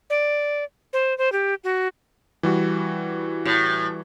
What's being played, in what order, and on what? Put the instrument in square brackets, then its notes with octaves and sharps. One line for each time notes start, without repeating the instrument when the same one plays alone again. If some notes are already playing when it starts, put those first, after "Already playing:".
[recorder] D5
C5
C5
G4
F#4
[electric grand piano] E3 G3 F#4
[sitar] A2